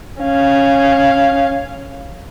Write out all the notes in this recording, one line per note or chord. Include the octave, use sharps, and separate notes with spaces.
C#4 F5